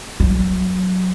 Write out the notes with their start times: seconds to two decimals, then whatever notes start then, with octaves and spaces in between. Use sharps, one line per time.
0.20 F#3